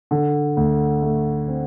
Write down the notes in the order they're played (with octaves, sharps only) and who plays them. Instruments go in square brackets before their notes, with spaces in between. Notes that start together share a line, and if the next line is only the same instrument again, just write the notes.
[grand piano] D3
D2
A3
C4